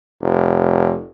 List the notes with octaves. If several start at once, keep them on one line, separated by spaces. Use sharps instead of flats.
F1